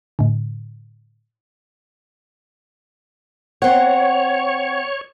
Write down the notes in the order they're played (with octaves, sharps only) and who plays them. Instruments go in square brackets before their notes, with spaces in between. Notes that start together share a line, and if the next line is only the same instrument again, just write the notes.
[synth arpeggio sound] A2 D3
[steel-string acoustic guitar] C4 F#5 [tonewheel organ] C#5